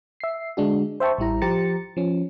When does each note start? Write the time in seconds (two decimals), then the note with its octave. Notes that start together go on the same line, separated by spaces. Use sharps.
0.20 E5 C7
0.57 D3 G#3 D4 F#4
1.00 C5 E5 G5 A5 C#6
1.18 A1 G3 E4 A#5
1.42 F3 G4 C5 A#5 A6 C#7
1.97 F3 C#4